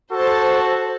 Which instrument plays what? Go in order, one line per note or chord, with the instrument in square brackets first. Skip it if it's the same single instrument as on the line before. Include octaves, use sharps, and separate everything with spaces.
[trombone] F#4 [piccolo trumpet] A4 [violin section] C5 A5